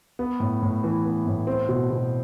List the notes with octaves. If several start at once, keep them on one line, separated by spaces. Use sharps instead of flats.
B3
A2
A2
E3
B3
A2
C4
B2
B2